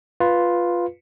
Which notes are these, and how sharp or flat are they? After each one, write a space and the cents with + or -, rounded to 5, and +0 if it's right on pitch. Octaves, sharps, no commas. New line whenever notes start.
F4 +5 B4 +0